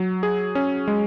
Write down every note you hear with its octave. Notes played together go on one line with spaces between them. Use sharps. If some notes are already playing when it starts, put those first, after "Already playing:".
Already playing: F#3
G#4
C#4
G#3